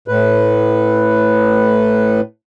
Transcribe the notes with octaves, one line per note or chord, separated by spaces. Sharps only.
A2 B4